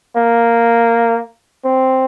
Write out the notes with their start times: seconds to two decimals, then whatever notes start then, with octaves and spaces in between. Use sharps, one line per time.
0.16 A#3
1.65 C4